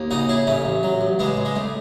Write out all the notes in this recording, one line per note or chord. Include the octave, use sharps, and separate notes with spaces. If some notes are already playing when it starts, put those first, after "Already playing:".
Already playing: D#2
C#3 D#4 F#4
C#3 E4 G#4
A1 A3 C#4
A1
F#3
A1
C#2 G#3 B3
C#2
G#3
C#2 A3